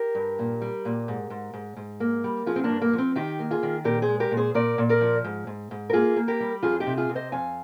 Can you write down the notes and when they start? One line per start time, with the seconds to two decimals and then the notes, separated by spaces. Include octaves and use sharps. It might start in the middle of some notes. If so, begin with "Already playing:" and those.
Already playing: G4 A#4
0.15 G2
0.39 A#2
0.62 G3
0.85 A#2
1.08 G#2
1.30 G#2
1.54 G#2
1.77 G#2
2.00 A#3
2.24 G3
2.46 F3 F4 G#4
2.56 C4
2.64 A#3 D4
2.69 G2
2.82 A#3
2.93 F3
2.98 C4
3.16 D#3 D#4 G4
3.39 A#3
3.51 F4 G#4
3.63 D#3
3.84 A#2 G4 A#4
4.02 G#4 C5
4.08 G#3
4.20 G4 A#4
4.31 A#2
4.37 G#4 C5
4.54 A#2 A#4 D5
4.78 A#2
4.89 A#4 D5
5.01 F3
5.24 G#2
5.47 G#2
5.71 G#2
5.90 A#4
5.93 A#3 F4 G#4
6.16 A#3
6.28 G4 A#4
6.40 G3
6.63 F2 F4 G#4
6.80 D#4 G4
6.86 C3
6.97 F4 G#4
7.09 C3
7.15 C5 D#5
7.32 F2 F5 G#5